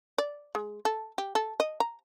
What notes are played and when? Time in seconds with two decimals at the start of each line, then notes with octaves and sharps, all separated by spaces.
0.18 D5
0.55 G#3
0.85 A4
1.18 G4
1.35 A4
1.60 D#5
1.80 A#5